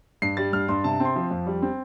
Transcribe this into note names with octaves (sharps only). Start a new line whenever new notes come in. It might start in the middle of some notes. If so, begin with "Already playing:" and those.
G2 C7
G3 A6
G2 F6
G2 C6
C3 A5
C4
C6
F3
F2
G3
C4